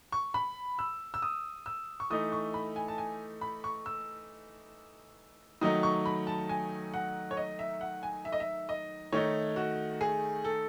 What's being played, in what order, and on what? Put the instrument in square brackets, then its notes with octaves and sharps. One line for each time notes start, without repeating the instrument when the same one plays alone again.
[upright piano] C#6
B5
E6
E6
D#6
E6
C#6
E3 A3 D#4 D#6
C#6
B5
G#5
A5
G#5
B5
C#6
E6
D#3 F#3 A3 D#4 D#6
C#6
B5
A5
G#5
F#5
C#5
D#5
E5
F#5
G#5
E5
D#5
E5
D#5
D#3 A3 D#4 C#5
F#4
G#4
A4